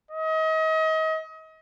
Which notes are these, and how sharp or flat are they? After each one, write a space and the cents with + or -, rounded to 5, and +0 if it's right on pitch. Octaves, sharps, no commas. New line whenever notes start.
D#5 +35